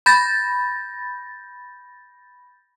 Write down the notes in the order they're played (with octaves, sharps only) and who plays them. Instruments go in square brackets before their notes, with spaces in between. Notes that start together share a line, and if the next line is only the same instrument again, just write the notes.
[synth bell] B5 G6 A6 A#6